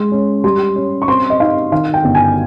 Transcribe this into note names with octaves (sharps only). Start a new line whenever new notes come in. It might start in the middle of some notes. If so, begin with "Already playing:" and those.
Already playing: G#3 C6
C#4
G3 C6
C#4
C#6
C4 C6
D#5
D#4 F5
D#3 F5
G5
G1
G#5